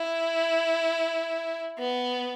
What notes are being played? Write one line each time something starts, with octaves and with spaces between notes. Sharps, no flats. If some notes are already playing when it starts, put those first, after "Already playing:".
Already playing: E4
B3